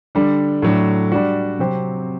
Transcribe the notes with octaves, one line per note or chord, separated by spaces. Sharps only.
D3 G3 D4
A2 F#3 A3 D4
G3 D4 F#4
C3 F#3 C4 G4 C5